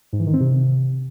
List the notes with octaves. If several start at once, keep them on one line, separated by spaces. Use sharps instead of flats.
G#2
E3
D#3
C4
C3